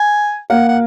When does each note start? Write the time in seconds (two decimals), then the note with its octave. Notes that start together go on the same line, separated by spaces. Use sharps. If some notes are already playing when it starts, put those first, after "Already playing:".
Already playing: G#5
0.50 A#3 A#4 F#5
0.69 F#5